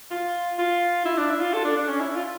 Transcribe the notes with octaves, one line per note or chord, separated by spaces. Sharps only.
F4
F4
E4
D4
E4
F4
A4
D4
D4
C#4
E4
F4